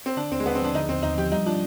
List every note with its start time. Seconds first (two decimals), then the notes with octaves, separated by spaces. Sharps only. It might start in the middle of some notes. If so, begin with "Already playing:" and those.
0.06 C4
0.17 D3 D4
0.31 D#2 C4
0.40 G#3
0.45 D#2 B3
0.55 C4
0.60 F3 D4
0.74 D3 D#4
0.88 D#2 C4
1.03 D#2 D#4
1.18 F3 G4
1.32 G3 D#4
1.46 D4 F4